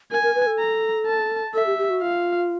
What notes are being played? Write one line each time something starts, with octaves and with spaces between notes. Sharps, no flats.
A#4 G#5
A#4
B4
A4
A#5
A5
A4 E5
G4
G4
F#4
F4 F5